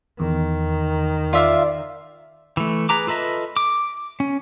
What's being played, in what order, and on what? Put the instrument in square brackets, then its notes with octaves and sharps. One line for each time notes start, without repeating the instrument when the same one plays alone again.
[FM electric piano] E2 [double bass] D#3
[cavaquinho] F4 E5 F5 [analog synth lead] D5
[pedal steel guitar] E3 A3
G#4 B4 A#5 D6
F4 A4 B4 D#5 E5
D6
C#4